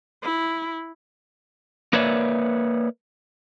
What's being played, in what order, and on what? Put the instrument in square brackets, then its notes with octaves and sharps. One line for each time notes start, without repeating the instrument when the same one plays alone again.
[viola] E4
[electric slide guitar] A#3 A#4 B4 C#5 D5 E5